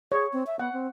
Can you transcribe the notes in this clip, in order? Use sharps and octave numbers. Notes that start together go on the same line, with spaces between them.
G#4 C#5
C4
E5
B3 F#5
C4